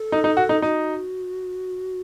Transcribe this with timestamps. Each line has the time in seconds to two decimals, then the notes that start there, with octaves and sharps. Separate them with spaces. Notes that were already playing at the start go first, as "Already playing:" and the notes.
Already playing: A4
0.12 D#4
0.24 D#4
0.37 F#4
0.49 D#4
0.62 D#4 F#4